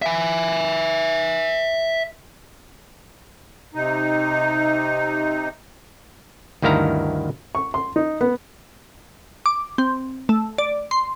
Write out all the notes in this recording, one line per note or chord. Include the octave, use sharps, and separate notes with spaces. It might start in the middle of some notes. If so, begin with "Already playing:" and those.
E5 G#5
C3 D#4
D2 G2 D#3 E4 F5 A#5
C#6
C6
D#4
B3
D6
C4
A3
D5
C6